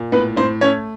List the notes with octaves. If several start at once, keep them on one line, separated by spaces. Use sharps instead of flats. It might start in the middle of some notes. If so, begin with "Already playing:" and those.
Already playing: A#2
A2 B3 B4
A2 C4 C5
A3 C#4 C#5